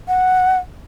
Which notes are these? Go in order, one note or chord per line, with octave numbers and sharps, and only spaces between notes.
F#5